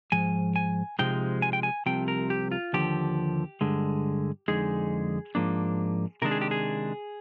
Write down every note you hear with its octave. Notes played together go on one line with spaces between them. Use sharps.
G#2 F3 G#5
G#5
C3 F3 G#3 D#4 G5
G#5
G5
G#5
C2 C3 F3 G5
A#4
G4
F4
D#2 D3 F3 G4
G2 D3 G#3
F2 D3 G#3 D#4 G#4
G#2 F3 A#3 D4
C3 D#3 G#3 D4 A#4
G#4
G4
G#4